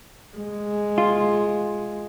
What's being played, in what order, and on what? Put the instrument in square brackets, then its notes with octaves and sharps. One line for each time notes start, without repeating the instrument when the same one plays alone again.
[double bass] G#3
[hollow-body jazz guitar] F4